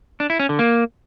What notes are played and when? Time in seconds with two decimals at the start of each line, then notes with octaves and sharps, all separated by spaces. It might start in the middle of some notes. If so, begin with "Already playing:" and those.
0.20 D4
0.30 E4
0.39 C#4
0.49 D3
0.59 A#3